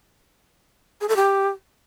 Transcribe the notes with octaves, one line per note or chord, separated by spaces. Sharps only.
G#4
A4
G4